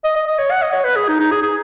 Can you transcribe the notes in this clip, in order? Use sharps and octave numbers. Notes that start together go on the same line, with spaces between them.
D#5
D#5
D#5
C#5
F#5
D#5
C#5
B4
G#4
D#4
D#4
G#4
G#4